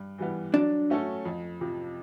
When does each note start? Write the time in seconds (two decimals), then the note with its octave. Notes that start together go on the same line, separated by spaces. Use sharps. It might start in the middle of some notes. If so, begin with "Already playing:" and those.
Already playing: G2
0.18 E3 G3 B3
0.54 F#3 D4
0.90 A3 C#4 F#4 A4
1.25 F2
1.61 C3 F3